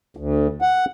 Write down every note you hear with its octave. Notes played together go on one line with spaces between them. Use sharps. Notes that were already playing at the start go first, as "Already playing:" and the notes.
D2
F#5